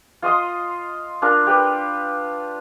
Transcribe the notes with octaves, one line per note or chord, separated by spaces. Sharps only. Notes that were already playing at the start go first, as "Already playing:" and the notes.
F4 D#5 C6 D#6
D4 F4 A#4
G4 B4